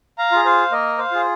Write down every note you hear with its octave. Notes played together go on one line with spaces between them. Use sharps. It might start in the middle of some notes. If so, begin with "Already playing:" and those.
F5 A#5
F4 G#4
C5 F5
A#3 A#4 D#5
C5 F5
F4 G#4